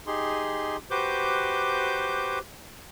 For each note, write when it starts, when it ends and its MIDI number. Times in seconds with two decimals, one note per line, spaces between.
0.07 0.76 63
0.07 0.76 67
0.07 0.76 68
0.07 0.76 84
0.91 2.39 66
0.91 2.39 67
0.91 2.39 71
0.91 2.39 72
0.91 2.39 86
0.91 2.39 91